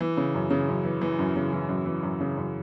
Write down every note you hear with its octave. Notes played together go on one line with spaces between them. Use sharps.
E3
C#3
F#2
C#3
F#2
E3
E3
F#2
C#3
E3
F#2
E3
F#2
C#3
F#2